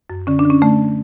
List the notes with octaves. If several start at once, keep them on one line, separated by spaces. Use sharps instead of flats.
F#2
D3 C#4
D4
D3
C#4
D3 A3